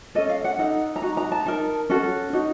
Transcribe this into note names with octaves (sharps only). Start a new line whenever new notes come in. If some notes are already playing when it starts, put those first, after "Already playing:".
C#4 A4 D#5
F5
F#5
D#4 A4 F#5
A#5
D#4 F#4
A#5
A5
D#4 A#4 A5
C#4 F#4 A4
D#4 F#4